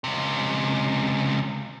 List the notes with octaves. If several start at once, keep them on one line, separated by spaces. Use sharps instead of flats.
C#2 C3